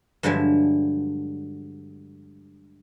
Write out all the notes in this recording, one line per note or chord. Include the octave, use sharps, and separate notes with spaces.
G2 D3 F3 F#3 G#3 E5